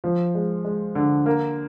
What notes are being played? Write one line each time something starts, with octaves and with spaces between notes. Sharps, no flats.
F3
G#3
G#3
D3
A#3